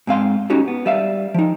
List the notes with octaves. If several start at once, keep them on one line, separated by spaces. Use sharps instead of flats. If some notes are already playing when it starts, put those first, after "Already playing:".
G#2 C4 F5 C6
C#4 D#4 F#4 G4 C#5
B3
G3 E5 F5
F3 D#4